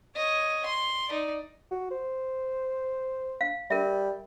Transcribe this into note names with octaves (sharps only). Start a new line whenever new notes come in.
C#5 D#5
C6
D#4 D5
F#4
C5
F5
G3 A#4 E5